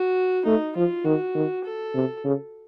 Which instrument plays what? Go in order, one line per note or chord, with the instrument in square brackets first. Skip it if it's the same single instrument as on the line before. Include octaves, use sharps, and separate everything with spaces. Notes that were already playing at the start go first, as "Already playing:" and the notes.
Already playing: [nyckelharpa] F#4
[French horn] A3 [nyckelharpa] D#4
[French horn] F3 [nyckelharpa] F4
[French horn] D#3 [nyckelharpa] F#4
[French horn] D#3
[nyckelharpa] A4
[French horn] C3
C#3